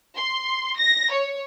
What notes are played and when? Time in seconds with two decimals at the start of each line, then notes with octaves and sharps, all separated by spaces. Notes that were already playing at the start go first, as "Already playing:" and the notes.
0.17 C6
0.78 A#6
1.12 C#5